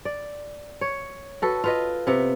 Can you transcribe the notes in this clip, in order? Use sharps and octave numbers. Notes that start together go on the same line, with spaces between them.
D5
C#5
F#4 A4 B4
F4 B4 D#5
C3 B3